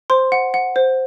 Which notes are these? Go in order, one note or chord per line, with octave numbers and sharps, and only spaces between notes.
C5 C6
F#5
F#5
C5